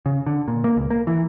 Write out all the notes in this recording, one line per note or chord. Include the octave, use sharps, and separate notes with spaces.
C#3
D3
A#2
A#3
C#2
A#3
E3